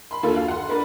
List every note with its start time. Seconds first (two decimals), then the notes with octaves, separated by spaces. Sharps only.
0.11 B5 C6
0.23 D#2 D3 D#3 F4 A4
0.35 F#4 F5
0.48 F#5 C6
0.69 D4 A#4 B4